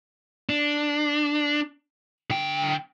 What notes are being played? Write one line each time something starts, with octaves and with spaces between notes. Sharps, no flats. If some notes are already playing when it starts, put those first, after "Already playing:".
D4
D3 G5